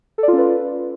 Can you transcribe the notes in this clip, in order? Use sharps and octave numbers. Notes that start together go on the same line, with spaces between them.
C#4 F4 A4 B4 D5